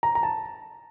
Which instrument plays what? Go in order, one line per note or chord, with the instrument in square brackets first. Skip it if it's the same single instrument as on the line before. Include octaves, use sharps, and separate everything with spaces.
[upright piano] A#5
A#5
A5